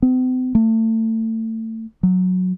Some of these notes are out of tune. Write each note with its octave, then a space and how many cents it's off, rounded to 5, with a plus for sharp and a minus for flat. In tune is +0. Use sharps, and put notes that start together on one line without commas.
C4 -45
A3 +30
F#3 -10